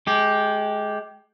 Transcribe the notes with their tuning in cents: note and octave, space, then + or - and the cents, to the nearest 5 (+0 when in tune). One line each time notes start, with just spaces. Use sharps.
G#3 +25 G4 +0